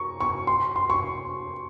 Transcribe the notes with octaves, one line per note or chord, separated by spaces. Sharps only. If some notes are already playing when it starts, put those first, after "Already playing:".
Already playing: A#5 C#6
C#6
C6
C6
C#6